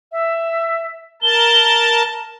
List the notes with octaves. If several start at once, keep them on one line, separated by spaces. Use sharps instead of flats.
E5
A#4 A5 G7